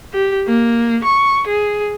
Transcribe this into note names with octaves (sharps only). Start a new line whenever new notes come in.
G4
A#3
C#6
G#4